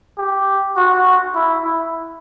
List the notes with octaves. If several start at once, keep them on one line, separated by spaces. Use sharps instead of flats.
G4
F#4
E4
E4